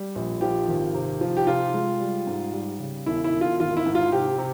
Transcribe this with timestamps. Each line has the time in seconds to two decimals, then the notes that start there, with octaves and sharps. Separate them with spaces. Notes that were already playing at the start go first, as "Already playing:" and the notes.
Already playing: G3
0.16 A#1
0.41 F3 G4
0.68 G#1
0.94 C3
1.21 F3
1.37 G4
1.47 C3 F4
1.74 G#3
2.01 G3
2.27 G#2
2.53 G3
2.80 C#3
3.06 E1 E4
3.24 E4
3.33 E1
3.41 F4
3.60 G#1 F4
3.77 E4
3.86 G#2
3.95 F4
4.12 C3 G4
4.38 C3